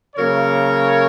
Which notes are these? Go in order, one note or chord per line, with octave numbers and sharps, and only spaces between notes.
C#3 F#3 A#3 A#4 C#5